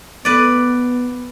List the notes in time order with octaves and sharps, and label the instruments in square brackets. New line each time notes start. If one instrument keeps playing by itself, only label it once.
[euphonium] B3 [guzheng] B4 D5